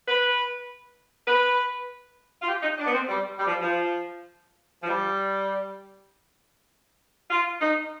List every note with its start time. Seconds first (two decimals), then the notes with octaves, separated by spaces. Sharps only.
0.07 B4
1.28 B4
2.41 F4
2.49 G4
2.63 D#4
2.78 D4
2.86 B3
2.93 C4
3.09 G3
3.38 G3
3.46 F3
3.61 F3
4.83 F3
4.89 G3
7.30 F4
7.61 D#4